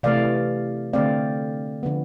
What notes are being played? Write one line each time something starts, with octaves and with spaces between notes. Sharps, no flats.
C3 E3 A3 D5 F5
D3 A3 C4 D5 F5
D3 F3 B3